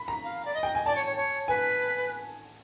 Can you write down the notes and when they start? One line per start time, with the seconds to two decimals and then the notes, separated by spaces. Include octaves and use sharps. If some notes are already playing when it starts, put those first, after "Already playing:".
Already playing: B5
0.08 A#5
0.24 F5
0.45 D5
0.54 D#5
0.63 G5
0.75 G#5
0.86 D5 A5
0.96 C#5
1.06 C#5
1.16 C#5
1.48 B4 G#5